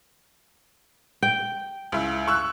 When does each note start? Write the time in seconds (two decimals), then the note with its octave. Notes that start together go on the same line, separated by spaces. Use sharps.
1.23 G5
1.92 C#2 E4
2.28 C#6 E6 F#6